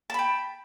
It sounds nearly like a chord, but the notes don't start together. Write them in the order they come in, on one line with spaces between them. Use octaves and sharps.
A5 B5 G5